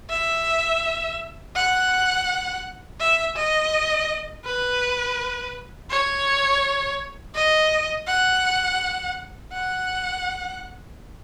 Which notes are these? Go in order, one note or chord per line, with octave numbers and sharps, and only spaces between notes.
E5
F#5
E5
D#5
B4
C#5
D#5
F#5
F#5